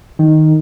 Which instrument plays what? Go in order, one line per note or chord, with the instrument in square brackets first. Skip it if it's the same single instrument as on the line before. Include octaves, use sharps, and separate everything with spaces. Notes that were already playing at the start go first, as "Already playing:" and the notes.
[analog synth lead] D#3